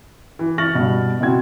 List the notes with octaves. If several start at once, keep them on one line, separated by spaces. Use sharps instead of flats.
E3
C#6 F6 A6 A#6 F#7
G2 B2
B2 E3 C4 F#4 G#6